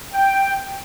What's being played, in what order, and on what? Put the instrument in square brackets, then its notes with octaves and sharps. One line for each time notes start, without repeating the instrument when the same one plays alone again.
[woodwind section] G5